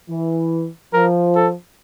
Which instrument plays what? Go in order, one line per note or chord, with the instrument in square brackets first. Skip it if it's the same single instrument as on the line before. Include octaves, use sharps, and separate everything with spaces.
[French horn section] E3
[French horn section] F3 [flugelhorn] A#4
[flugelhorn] A4